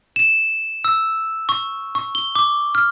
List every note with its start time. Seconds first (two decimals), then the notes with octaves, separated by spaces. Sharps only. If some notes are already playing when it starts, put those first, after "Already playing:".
0.16 E7
0.85 E6
1.49 C#6
1.95 C#6
2.15 G7
2.35 D6
2.75 F6